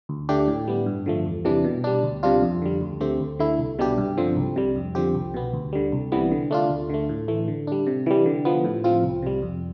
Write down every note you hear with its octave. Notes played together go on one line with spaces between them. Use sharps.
D2
D3 A3 D4 G4
A2
G3 B3
G2
D3 F3 A3
E2
C3 E3 G3 D4
B2
G3 D4
D2
C3 G3 D4 F4
F2
D3 G3
D2
D3 A3 C4 G4
D2
D3 A3 E4
C2
B2 G3 D4 G4
G2
D3 F3 C4
C2
C3 G3
F2
D3 F3 C4 G4
C2
B2 B3
D2
D3 G3
C2
C3 E3 G3 B3
D3
A3 D4 F4
D2
D3 A3
A2
E3 A3
D3
G3 D4
C3
E3 G3
D3
F3 B3
A2
F3 C4 F4
C2
C3 G3
F2